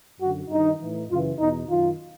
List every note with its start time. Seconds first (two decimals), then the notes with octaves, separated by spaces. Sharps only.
0.20 F#2 D3 F#4
0.49 G2 D#3 D#4
0.79 A2 E3
1.09 F#2 C#3 E3 F4
1.39 E2 B2 D#4
1.68 F#2 D#3 F4